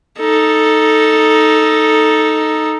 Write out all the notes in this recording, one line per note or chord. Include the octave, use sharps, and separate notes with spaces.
D#4 A4